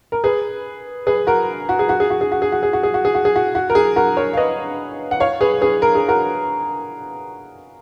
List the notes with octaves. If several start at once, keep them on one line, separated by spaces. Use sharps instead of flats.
A#4
G#4 B4
G#4 B4
F#4 A#4
F#4
G#4
F#4
G#4
F#4
G#4
F#4
G#4
F#4
G#4
F#4
G#4
F#4
G#4
F#4
G#4
F#4
F#4
A#4
G#4
F#4 A#4
A#4 C#5
F5
B4 D#5
F#5
C#5 F5
G#4 B4
G#4 B4
A#4
G#4
F#4 A#4